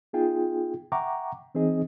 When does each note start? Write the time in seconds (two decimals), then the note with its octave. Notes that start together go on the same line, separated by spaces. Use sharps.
0.13 B3 D#4 F4 G#4 G5
0.92 E5 F#5 G5 A#5 C#6 D6
1.55 E3 C4 D#4 G#4 D#5